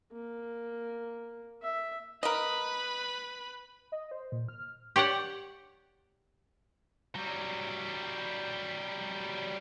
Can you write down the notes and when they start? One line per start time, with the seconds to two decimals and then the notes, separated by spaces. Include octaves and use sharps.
0.12 A#3
1.62 E5
2.23 A#4 B4 D#5 B5
3.92 D#5
4.11 C5
4.32 A#2
4.49 F6
4.96 G4 C#5 D5 F#5
7.15 F#3 G3